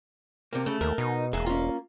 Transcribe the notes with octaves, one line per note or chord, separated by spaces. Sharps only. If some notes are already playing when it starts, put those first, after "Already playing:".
C3 A#3
C#3 A3
D#2 A#4
B2 D#4
E1 A#3 G#4 E5
C#4 F4